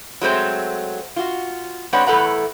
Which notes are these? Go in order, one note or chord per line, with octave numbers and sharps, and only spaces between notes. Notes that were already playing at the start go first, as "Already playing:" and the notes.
F#3 G#3 A3 C4 C5
F4 F#4
G#3 C4 D4 B4 C#5 F#5
E2 A2 A4 B4 F#5 A#5